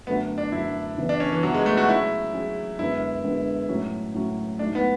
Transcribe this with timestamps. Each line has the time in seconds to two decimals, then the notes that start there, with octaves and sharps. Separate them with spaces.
0.07 F#2 D3 F#3 A3 B3
0.38 D4
0.52 F#2 D3 F#3 A3 E4
0.98 C#3 E3 B3 E4
1.09 D4
1.20 C#4
1.32 E3
1.43 C#3 E3 F#3 B3 E4
1.54 G#3
1.66 A3
1.77 F#4
1.88 F#3 C#4 E4 G#4
2.33 F#3 C#4 G#4
2.79 F#2 D3 G#3 B3 E4
3.24 F#2 D3 G#3 B3
3.69 A2 F#3 C#4
4.14 A2 F#3 C#4
4.59 G#2 F#3 A3 D4
4.75 B3